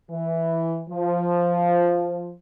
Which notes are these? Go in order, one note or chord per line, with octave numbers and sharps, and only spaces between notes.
E3
F3